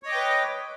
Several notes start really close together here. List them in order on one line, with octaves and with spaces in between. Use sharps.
C#5 D#5 D6 G5 B4